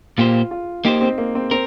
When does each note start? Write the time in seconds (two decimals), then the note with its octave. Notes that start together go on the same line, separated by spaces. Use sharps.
0.18 A#2 A#3 F4 G4 C5
0.51 F4
0.85 A#3 D#4 G4 C5
1.01 C4
1.18 A#3
1.35 C4
1.51 C4 A#4